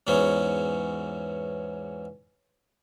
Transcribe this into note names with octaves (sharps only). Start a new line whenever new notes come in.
E2 G#2 F#3 B3 C#4